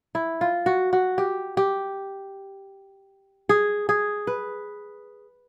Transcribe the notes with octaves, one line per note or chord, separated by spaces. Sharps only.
E4
F4
F#4
F#4
G4
G4
G#4
G#4
B4